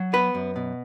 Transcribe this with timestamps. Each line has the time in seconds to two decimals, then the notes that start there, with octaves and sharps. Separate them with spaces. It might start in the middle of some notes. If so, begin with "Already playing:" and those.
Already playing: F#3
0.13 B3 B4
0.35 F#2
0.56 B2